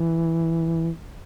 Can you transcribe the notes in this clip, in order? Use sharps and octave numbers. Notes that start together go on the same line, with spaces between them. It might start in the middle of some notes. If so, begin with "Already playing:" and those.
Already playing: E3